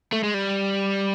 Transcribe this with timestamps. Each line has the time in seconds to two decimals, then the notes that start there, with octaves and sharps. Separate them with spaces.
0.12 A3
0.23 G#3
0.34 G3